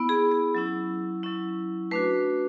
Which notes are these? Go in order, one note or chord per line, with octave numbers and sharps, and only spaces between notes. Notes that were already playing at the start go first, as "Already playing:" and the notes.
Already playing: B3 E4
G#4
G#4
F#3 C#4 E4
F#3 C#4 E4
A3 D4 F#4 B4